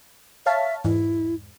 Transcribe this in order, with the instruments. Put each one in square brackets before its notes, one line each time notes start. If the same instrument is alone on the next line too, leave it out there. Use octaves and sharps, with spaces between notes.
[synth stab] C#5 F5 A5 [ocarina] E5
[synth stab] E2 G#2 [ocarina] E4